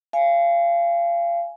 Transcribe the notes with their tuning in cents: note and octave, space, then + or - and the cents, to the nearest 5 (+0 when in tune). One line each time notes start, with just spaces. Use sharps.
F5 -30 G#5 +0